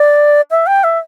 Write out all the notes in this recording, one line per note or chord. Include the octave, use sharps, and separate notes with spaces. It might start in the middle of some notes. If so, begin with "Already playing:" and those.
Already playing: D5
E5
G5
E5